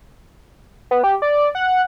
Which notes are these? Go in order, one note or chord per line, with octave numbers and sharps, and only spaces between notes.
B3
G4
D5
F#5